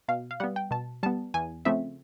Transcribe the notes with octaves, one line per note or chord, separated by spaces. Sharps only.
B2 F5
F5
G3 B3 F#5
G5
B2 A5
G3 B3 A5
E2 G#5
C#3 F3 A3 C4 E5